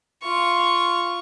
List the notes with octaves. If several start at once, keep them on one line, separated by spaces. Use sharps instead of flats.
F4 C#6